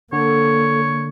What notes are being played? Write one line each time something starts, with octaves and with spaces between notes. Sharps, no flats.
D3 A#3 A4 C#5